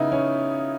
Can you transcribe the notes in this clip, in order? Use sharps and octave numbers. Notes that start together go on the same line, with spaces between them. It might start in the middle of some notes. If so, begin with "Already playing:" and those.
Already playing: C#3 B3 D#4 E4
C#4